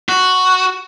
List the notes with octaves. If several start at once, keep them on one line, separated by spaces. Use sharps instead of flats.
F#4